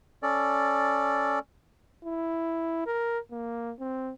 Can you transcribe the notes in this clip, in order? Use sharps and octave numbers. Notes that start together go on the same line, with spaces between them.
C#4 A4 D5
E4
A#4
A#3
C4